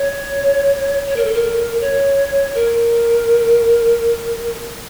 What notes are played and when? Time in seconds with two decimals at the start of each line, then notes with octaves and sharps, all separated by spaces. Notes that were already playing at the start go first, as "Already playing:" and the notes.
Already playing: C#5
1.08 C#5
1.16 A#4
1.25 A4
1.34 A#4
1.81 C#5
2.55 A#4